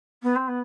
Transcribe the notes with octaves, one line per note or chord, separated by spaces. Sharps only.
B3
C4
B3